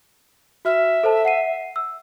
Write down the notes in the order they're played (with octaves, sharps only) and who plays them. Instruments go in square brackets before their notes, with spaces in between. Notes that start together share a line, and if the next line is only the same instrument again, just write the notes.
[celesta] F#4 F6 [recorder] E5
[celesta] A4 C5 A5
F#5 C7 D#7
E6